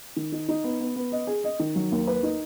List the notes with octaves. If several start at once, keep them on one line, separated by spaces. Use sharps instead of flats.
D#3
D#4
D#4
B3
B3
B3
D#5
G#4
D#5
D#3
F#3
D#2
B4
D#4